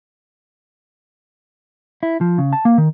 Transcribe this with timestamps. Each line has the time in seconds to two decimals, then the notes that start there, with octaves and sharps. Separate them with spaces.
2.03 E4
2.21 F3
2.38 C#3
2.53 A5
2.65 A#3
2.78 D#3